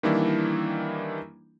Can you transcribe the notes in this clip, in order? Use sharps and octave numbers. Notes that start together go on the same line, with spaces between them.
D#3 E3 G3 A#3 D4 E4